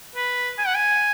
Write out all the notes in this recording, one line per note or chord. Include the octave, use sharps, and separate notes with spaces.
B4
G#5
F#5
G#5